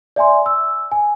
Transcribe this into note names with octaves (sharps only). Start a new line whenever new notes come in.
D5 E5 G#5 C6
E6
G#5